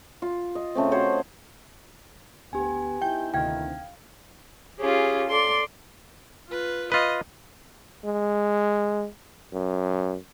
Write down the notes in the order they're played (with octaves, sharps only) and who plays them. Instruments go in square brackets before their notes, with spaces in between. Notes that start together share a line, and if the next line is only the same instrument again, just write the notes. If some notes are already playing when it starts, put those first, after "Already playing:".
[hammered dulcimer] F4
D#5
C#3 A3 C4
F#4 C5 C#5 F#5
[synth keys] D2 [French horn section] B3 [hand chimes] G4 G#5
[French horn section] B3 D#4 E4 [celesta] G5 [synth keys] G6
[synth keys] D2 C3 D#3 [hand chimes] F5 [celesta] G5 G#6
[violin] C#4 F4 [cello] G4 G#4
[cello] A4 D5 [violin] C6
[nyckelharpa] F4 B4
[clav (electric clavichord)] F4 B4 [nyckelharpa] D#5
[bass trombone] G#3
F#2